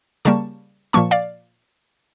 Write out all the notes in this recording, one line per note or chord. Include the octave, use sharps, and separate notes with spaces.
C#3 G3 A#3 A5 C#6
A#2 F3 A#3 A5 C#6
D5 F5